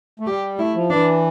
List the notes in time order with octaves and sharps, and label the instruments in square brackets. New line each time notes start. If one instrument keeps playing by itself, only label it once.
[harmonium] A3
[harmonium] G3 [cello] G4
[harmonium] A3 [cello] E4
[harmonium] F3
[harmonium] E3 [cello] D4